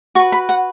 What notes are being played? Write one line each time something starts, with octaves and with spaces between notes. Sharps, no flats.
F#4 B4 C#6
B5
F#5